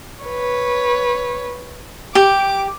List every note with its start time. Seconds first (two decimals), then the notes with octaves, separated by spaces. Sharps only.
0.24 B4 C#5
2.15 G4 D6